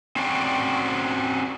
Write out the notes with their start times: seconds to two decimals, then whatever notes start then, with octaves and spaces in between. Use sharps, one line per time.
0.16 C4 C#4 F#4 D5 G5